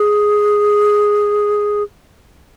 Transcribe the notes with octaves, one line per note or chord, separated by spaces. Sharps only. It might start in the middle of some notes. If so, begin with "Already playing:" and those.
Already playing: G#4